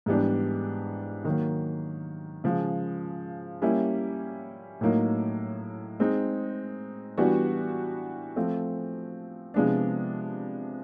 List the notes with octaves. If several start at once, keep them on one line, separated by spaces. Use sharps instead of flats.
G#2 E3 G3 B3 D4
D#3 F#3 A#3
C#3 F3 G#3
G3 A#3 C#4 E4
A2 F#3 A#3 D#4
G#3 C4 D#4
E3 G3 B3 D4 F#4
F3 A3 C4
C3 F3 G#3 B3 D4